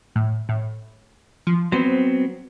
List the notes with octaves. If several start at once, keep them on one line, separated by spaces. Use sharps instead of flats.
A2
A2
F3
F#3 B3 C4 C5